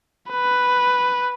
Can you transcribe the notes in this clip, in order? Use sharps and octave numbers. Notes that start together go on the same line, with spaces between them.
B4